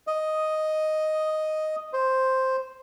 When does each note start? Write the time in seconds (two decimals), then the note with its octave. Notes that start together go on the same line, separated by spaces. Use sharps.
0.07 D#5
1.93 C5